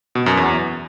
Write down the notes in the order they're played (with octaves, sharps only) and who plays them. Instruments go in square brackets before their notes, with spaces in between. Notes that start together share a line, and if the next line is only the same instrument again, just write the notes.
[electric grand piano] B2
F#2
E2